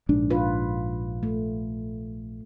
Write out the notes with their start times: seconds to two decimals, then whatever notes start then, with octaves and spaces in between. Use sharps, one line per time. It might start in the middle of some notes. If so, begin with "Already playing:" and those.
0.09 A#1 G#2 D4
0.30 F4 B4
1.23 A3